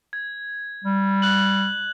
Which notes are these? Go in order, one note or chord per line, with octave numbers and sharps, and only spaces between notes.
G#6
G3
F#6 F#7